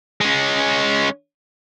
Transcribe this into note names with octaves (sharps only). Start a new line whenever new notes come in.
G#3 C#4